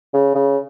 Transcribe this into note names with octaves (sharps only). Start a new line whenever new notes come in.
C#3
C#3